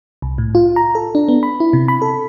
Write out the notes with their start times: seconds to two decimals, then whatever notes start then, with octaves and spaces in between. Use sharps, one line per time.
0.22 C2
0.38 A2
0.55 F4
0.76 A#5
0.95 A4
1.15 D4
1.28 B3
1.43 B5
1.60 E4
1.73 C3
1.88 B5
2.02 A4